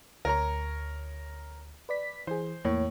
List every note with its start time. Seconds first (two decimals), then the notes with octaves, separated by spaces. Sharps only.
0.25 D2 A#4 C#5 A#5
1.89 B4 D5 B6
2.27 E3 G#4 C5
2.65 E2 A2 A#3 C#5